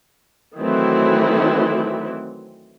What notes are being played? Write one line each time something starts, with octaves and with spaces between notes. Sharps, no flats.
D#3 E3 F#3 A3 C4 E4